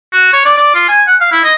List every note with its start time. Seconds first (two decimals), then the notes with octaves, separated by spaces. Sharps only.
0.13 F#4
0.33 C#5
0.45 D5
0.57 D5
0.75 F4
0.89 G#5
1.07 F#5
1.21 F5
1.32 E4
1.44 D#5